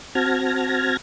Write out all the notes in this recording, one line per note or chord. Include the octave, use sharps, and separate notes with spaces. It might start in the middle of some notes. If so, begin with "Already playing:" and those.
C4 F#4 A5 F6 G#6 A#6